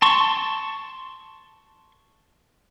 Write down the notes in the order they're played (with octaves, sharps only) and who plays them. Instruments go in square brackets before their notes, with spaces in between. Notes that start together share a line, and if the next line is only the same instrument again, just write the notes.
[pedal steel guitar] A5 C6 C#6